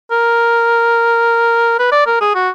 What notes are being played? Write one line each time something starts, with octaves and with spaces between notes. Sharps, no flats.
A#4
B4
D5
A#4
G#4
F#4